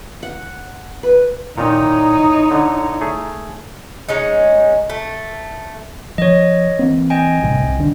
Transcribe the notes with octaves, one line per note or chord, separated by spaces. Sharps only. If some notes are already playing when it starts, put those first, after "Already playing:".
F#5
B4
A#2 D#3 D#4 E4 C#5 A#5
D3
A3 G#4
G#3 C#4 D#4
A3
F3 C#5 D#5
E3 A#3 C4
D#5 G5 G#5
A1 G2 C3
C2
D#1 D3 D4